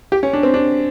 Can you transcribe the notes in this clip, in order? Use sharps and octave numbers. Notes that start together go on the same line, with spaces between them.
G4
C#4
D4
C4
D4